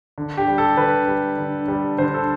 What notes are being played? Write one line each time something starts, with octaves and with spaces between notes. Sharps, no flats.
D3
G4
G3
A4
D3 B4
G3
D3
G3
D3 C5
A4